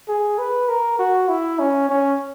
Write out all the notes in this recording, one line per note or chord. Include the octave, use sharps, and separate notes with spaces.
G#4
B4
A#4
F#4
E4
C#4
C#4